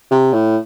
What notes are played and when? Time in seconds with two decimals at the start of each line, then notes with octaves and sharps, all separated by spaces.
0.11 C3
0.33 A2